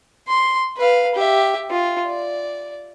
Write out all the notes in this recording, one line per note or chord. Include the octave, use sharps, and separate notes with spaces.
C6
B4 F5
G4 E5
F4
D5